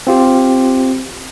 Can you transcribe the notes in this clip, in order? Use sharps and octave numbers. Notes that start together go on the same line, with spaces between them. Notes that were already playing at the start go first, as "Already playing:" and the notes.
C4 F4 G4